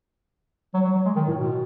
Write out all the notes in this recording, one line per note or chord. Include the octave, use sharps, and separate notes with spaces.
F#3
F#3
F#3
G#3
D#3
A2
B2